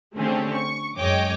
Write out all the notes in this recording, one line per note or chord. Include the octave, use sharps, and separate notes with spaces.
D3 A3 C4 C#4 G4 G#4
C#6
F#2 G#3 C#5 D#5 G5 D6